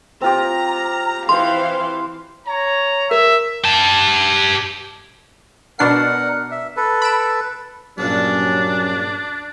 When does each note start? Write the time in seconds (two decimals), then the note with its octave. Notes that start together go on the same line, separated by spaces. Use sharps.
0.22 C4 F4 G4 A#5
1.29 E3 C5 F5 C6
2.47 C#5 A#5
3.11 A#4 E5
3.64 G4 A5
5.79 B2 D4 A#4 F#5 C7
6.52 E5
6.77 A4 B4
7.02 B5 D7 E7
7.98 A#1 G2 A#2 F#3 C#4 D4